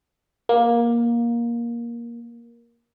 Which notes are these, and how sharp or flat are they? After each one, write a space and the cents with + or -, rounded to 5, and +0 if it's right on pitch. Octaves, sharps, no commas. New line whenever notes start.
A#3 +15